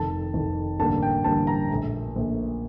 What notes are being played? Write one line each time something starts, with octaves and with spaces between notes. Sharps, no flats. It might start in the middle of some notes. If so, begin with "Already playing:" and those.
Already playing: F1 F2 D#3 A5
F1 F2 D#3
A1 G2 D3 G3 A#3 A5
G5
A1 G2 D3 G3 A#3 A5
A#5
A#1 A#2 A3
A#1 A#2 A3